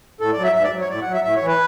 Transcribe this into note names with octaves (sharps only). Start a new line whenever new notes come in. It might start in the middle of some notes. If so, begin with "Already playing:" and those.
A2 A4
D5
F#3
E5
G#2 E5
D5
F#3
C#5
A2 D5
F#5
F#3
E5
A2 E5
C#5
E3
B4